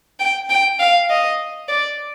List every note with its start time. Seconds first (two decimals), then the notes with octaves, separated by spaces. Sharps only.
0.20 G5
0.50 G5
0.80 F5
1.09 D#5
1.68 D5